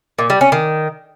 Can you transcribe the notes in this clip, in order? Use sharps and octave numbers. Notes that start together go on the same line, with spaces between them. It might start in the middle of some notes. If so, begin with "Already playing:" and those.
A#2
G3
C#4
D#3